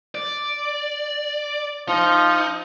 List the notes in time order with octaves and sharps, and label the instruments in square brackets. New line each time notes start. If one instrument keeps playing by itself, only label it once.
[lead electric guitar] D5
[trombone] F3 [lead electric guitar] D#4